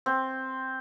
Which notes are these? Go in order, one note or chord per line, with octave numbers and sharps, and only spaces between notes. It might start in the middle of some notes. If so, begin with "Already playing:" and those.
C4